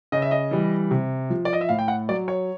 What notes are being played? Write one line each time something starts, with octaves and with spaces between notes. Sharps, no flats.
C#3 D#5
E5
D#5
E3 G3
C3
F3
D5
D#5
E5
A2 F5
G5
F#5
F#3 D5
C#5